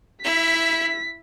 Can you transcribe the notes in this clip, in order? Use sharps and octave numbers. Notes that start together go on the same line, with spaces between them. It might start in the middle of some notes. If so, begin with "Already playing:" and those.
E4 E5 B6